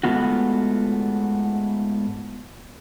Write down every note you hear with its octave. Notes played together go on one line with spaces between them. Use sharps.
G#2 A3 B3 F4 F#4